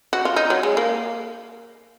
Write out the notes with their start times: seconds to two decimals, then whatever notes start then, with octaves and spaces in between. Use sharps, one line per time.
0.13 F#4
0.25 F4
0.36 D#4
0.50 F#3
0.63 G#3
0.77 A#3